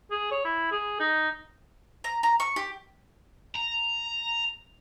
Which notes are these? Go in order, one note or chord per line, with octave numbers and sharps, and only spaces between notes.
G#4
C#5
E4
G#4
D#4
A#5
A#5
C#6
G4
A#5